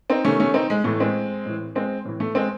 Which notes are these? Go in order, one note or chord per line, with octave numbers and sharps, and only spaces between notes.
C4 D#4
C3 D#3 A3 C#4
A3 C#4
C4 D#4
G#3
A2 E3 A3
G#3 C4
A2 E3
G#3 C4
A2 E3
A3
G#3 C4